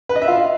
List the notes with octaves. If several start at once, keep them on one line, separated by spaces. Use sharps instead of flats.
B4
D#5
E5
F4